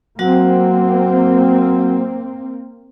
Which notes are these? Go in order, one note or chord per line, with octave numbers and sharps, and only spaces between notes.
F#3 A#3 C4 F#4 F#5